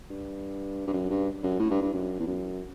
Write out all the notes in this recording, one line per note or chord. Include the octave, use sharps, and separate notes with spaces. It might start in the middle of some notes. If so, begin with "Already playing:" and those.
G2
G2
F#2
G2
F#2
A2
G2
G2
F#2
E2
F#2